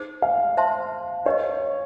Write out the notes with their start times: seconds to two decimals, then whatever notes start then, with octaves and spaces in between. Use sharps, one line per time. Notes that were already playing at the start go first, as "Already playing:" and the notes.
Already playing: D#4 G#4 C5
0.22 F5
0.57 C5 E5 A5 C6
1.26 D4 G4 B4 C#5 D#5